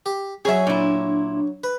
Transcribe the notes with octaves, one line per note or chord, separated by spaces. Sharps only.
G4
F#3 C#4 G#4 E5
A#2 D4 E4
B4